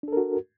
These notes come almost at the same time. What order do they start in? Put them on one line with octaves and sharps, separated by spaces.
D4 A4 A#4 F#4